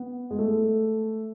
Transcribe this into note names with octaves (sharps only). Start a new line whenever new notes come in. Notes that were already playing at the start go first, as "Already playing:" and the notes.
Already playing: B3
G#3
A3